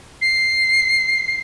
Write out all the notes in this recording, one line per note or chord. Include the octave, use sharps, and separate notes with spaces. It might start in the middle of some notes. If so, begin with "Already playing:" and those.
C7